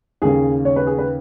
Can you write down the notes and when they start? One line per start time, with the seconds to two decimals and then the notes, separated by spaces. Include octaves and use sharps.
0.22 D#2 C#3 G#4
0.65 C#5
0.76 B4
0.87 G#4
0.98 B4